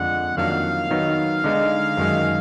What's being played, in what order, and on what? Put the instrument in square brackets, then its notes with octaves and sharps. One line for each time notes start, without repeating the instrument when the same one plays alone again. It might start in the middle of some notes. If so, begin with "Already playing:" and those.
Already playing: [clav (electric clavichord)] F2 D3 G#3 [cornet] F#5
[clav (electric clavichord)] F2 D#3 F#3 A#3 D4 [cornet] F5
[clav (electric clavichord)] D#3 F#3 B3 D#4
D3 G#3 D#4
F#2 D#3 G#3